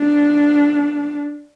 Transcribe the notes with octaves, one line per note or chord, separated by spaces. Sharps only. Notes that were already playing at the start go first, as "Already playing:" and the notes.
Already playing: D4